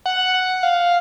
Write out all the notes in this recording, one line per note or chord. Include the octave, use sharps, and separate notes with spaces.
F#5
F#5
F5